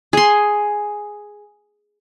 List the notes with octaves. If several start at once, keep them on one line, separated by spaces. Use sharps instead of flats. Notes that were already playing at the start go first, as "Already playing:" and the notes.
G#4 C6